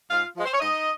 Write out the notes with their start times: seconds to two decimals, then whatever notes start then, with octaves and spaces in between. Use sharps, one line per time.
0.10 G#2 F4 F5
0.35 F3 G#3
0.45 C5
0.53 C#5
0.60 G#2 D#4 D#5